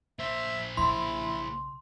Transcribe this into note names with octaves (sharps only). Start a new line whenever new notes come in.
A#3 C5 E5
B1 C#3 E4 C6